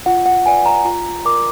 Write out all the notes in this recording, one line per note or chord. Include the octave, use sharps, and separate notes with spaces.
F4 F#5
F#5
B4 D5 G#5
A#5
F4 A#5
A#4 D5 D6